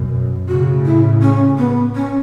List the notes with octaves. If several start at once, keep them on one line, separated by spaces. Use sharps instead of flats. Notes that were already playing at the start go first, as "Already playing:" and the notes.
Already playing: F#2 B2
A2 C#3 F#4
E4
C#4
B3
C#4